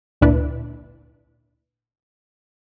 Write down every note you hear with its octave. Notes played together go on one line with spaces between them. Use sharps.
G#1 D2 A#2 D4 E4 B4